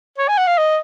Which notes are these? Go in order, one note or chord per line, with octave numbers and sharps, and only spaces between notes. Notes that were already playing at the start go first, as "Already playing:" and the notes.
C#5
G#5
F#5
F5
D#5